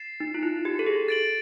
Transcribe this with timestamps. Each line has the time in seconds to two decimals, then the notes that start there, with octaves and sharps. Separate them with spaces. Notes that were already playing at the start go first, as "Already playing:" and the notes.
Already playing: A6 C7 E7
0.20 D#4
0.34 F4
0.43 E4
0.65 G4
0.79 A4
0.86 G#4
1.08 A6 D7 F#7